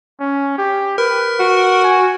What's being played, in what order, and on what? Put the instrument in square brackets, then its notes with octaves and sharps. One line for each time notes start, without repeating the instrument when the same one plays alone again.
[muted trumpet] C#4
G4
[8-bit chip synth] A#4 [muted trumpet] B4
[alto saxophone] F#4
[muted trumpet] G#5